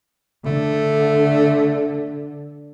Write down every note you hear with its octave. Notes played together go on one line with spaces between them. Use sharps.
D3 A3